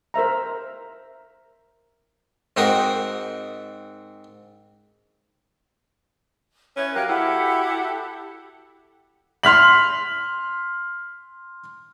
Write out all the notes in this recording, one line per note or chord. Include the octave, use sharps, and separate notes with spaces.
A#4 C5 E5 A#5
G#2 C4 D#4 F#4 A#4 D#6
C#4 E4 B4 C#5
F#3 G4 A#4 F5 G5 F#6
E4 F#4 G4 A4 F#5
C6 F6 B6 F#7